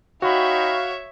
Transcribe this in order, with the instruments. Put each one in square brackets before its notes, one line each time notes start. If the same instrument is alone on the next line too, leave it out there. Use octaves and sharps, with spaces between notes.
[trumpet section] D#4 G5 B5 [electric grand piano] F#4 [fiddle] C#5 E5 [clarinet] F5